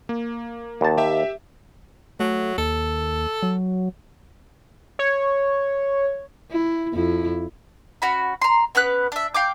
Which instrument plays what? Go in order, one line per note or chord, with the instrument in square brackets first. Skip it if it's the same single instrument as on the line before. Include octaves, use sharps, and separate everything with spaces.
[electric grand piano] A#3
[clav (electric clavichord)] D#2 A5
[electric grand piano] G4 E5
[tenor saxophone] F#3 [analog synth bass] A3
[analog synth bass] D#2 [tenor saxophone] A4
[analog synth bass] F#3
[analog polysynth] C#5
[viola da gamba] E4
F2 E4
[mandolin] C#4 F#4 B5
A#5 C6
B3 C#4 B4 F#6
D4 E5
F5 G5 D6